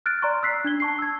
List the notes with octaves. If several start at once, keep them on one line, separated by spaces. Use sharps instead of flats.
F6 F#6 A6 D7
D5 A#5 C6 C#6
E6 F#6 B6 C7
D4 G#6 G7
A5 C#6 C7
E6 G#6